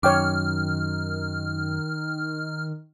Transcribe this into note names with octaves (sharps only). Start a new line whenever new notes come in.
F#2 D#3 C#5 G5 D6 F6